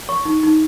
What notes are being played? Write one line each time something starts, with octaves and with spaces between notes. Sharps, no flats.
C#5 C#6
D#4
D#4